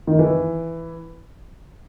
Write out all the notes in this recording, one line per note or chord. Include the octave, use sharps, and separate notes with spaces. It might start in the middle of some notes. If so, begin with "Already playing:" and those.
D#3
E3